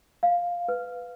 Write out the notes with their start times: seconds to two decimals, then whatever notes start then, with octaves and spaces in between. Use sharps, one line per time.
0.23 F5
0.68 B4